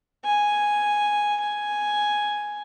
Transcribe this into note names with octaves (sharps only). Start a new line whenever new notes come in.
G#5
G#5